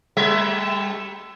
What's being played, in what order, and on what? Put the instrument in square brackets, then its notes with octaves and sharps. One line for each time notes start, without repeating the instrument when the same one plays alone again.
[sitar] G3 A3 E5